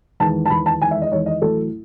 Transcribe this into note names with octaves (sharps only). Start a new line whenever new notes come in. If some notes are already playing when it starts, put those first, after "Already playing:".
E2 D#3 G#3 A5
A5
E2 D#3 G#3 B5
A5
E2 D#3 G#3 G#5
E5
D#5
E2 D#3 G#3 C#5
D#5
A1 A2 F#3 A4